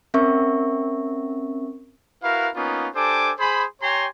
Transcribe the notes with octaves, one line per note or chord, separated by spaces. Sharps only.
C4 C#4 A#4 E5 C#6
E4 F#4 A#4 B4 F5
A#3 B3 C#4 D#4 F4
D4 G4 A4 C5 G#5 D6
G#4 C5 B5
G4 C#5 G5 G#5 A#5 C6